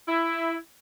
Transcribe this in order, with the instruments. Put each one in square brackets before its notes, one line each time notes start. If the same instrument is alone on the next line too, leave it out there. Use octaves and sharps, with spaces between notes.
[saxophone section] E4